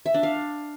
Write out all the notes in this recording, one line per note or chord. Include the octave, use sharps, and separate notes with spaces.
E5
D4
F5